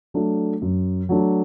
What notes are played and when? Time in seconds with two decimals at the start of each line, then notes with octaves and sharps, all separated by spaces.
0.14 F#3 A3 D4
0.62 F#2
1.09 F#3 A3 D4